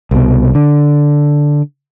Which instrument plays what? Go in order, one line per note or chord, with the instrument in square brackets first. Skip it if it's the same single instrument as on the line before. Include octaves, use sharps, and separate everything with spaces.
[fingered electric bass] C2 B2
D3